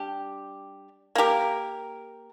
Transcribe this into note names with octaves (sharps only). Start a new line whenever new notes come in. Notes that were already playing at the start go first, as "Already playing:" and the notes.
Already playing: G3 D4 G4
A#3 G4 A#4